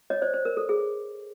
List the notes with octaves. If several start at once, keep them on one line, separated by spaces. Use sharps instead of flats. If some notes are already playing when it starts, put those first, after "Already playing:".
C#5 D#5
C5 D5
C5
A#4
A4
G#4